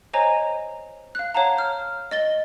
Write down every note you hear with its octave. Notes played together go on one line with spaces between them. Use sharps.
C5 C#5 D#5 G#5 A#5
F5 F#6
C#5 F5 F#5 A5 A#5
F6 G6
D#5 A6 G7